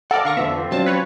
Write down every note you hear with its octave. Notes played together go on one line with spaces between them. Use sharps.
A4 A#4 D5 F#5
D3 F5 C#6 A#6
F2 D3 F3 B3 E5
C4 F4
F#3 C#4 D4 A5
B4 C#5